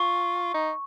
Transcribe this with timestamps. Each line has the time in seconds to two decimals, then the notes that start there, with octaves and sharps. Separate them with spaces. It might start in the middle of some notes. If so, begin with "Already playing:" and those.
Already playing: F4 C#6
0.54 D#4